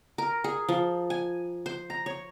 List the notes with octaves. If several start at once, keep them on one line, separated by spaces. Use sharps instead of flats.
A#4
G#4
F3
G#5
C5
A#5
C#5